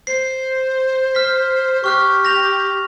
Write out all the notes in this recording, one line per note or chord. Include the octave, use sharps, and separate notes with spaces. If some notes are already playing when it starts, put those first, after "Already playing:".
C5 C7
F6 B6
G4 C#6 F6 F#6
A#6 F7